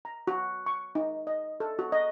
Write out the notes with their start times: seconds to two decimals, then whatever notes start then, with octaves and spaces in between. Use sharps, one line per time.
0.05 A#5
0.27 F#4
0.66 C#6
0.95 D#4
1.27 D#5
1.60 A4
1.79 F#4
1.92 D#5